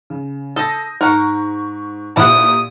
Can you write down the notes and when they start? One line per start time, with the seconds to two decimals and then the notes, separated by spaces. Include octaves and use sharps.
0.10 C#3
0.56 A4 D#6 G6 A#6
1.01 G#2 A#4 F#5 C#6
2.17 A#2 E4 G4 F#5 D#6